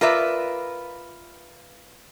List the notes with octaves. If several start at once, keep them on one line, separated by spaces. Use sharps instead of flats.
F4 A#4 B4 D5 E5